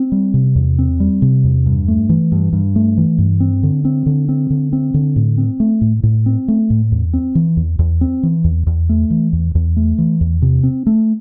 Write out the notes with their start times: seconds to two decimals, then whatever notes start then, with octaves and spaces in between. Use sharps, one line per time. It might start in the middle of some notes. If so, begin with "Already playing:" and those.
Already playing: C4
0.12 G3
0.34 C3
0.56 E2
0.79 C4
1.00 G3
1.22 C3
1.44 E2
1.66 G2
1.88 A3
2.09 E3
2.32 G2
2.53 G2
2.76 A3
2.98 E3
3.18 G2
3.40 C4
3.63 D3
3.85 C4
4.06 D3
4.29 C4
4.50 D3
4.73 C4
4.94 D3
5.16 A2
5.38 C4
5.60 A3
5.81 A2
6.03 A2
6.26 C4
6.48 A3
6.70 A2
6.92 E2
7.13 C4
7.35 E3
7.57 E2
7.79 E2
8.01 C4
8.23 E3
8.44 E2
8.67 E2
8.89 A3
9.10 E3
9.33 E2
9.55 E2
9.76 A3
9.98 E3
10.21 E2
10.42 C3
10.63 C4
10.87 A3